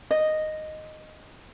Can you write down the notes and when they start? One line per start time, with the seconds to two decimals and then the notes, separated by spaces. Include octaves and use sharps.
0.11 D#5